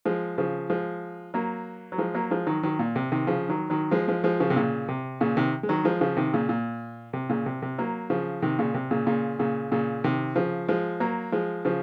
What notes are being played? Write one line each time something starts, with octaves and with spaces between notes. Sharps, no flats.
F3 G#3
C#3 F3
F3 G#3
F#3 A#3
F#3
F3 G#3
F#3 A#3
F3 G#3
D#3 F#3
D#3 F#3
A#2
C3
C3 D#3
C#3 F3
D#3 F#3
D#3 F#3
F3 G#3
F3 G#3
F3 G#3
C#3 F3
C3
A#2 C#3
C3
A#2 C#3
C3 D#3
G#3
D#3 F#3
F3 G#3
C#3 F3
C3 D#3
A#2 C#3
A#2
C3
A#2 C#3
C3
C3
F#3 A#3
C#3 F3
C3 D#3
A#2 C#3
C3
A#2 C#3
A#2 C#3
A#2 C#3
A#2 C#3
C3 D#3
C#3 F3
F3 G#3
F#3 A#3
F3 G#3
C#3 F3